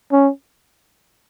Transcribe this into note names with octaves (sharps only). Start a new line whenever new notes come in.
C#4